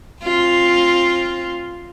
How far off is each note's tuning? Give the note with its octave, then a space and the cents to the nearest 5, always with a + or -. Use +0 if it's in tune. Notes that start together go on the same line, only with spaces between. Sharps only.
C4 +25 F4 +0